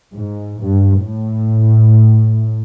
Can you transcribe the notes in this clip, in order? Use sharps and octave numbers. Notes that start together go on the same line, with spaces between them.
G#2
G2
A2